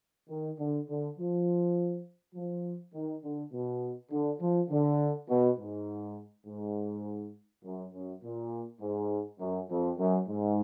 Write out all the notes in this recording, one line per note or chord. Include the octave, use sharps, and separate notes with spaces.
D#3
D3
D3
F3
F3
D#3
D3
B2
D3
F3
D3
B2
G#2
G#2
F#2
F#2
A#2
G#2
F#2
F2
F#2
G#2